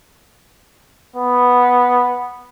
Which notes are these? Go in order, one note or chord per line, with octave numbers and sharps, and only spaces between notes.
B3